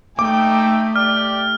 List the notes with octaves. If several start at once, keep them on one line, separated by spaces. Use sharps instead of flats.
A3 D#4 E5 G5 D6
G4 D5 F6